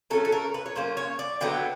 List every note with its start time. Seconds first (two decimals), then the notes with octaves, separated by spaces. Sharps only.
0.10 F#3 A#3 C#4 A4
0.25 A4
0.32 A#4
0.54 B4
0.66 C#5
0.75 F#3 A#3 C#4 C5
0.97 C#5
1.19 D5
1.41 D3 F#3 B3 G5